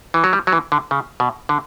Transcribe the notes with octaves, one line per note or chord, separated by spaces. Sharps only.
E3
F#3
G3
F#3
E3
D3
C#3
B2
D3